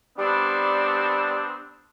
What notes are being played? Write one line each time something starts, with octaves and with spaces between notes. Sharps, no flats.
G3 B3 C4 D4